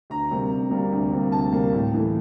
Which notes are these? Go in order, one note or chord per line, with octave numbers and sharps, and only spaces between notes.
D2 A#5
C3 G3 A#3
D2
C3 G3 A#3
D2
C3 G3 A#3
D2 A5
C3 G3 A#3
A2
E3 A3